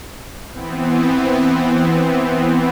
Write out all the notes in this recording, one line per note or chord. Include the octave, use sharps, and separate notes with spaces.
E3 B3 C4